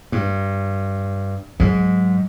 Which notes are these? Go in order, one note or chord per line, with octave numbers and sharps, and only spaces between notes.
G2
G#2 F#3